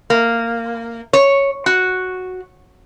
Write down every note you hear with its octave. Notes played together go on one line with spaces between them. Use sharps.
A#3
C#5
F#4